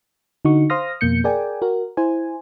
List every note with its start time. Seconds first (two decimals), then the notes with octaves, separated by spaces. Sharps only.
0.45 D3 D#4 F#4 C#6
0.70 C5 F5 C6 D#6 F6 A#6
1.01 F2 B2 A#3 G6 C#7
1.24 G#4 A#4 D5 G5 G#5
1.62 F#4 A#4
1.97 E4 C5 G#5